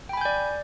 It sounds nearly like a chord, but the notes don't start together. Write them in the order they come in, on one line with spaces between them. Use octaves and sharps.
G5 B5 G#5 G6 D5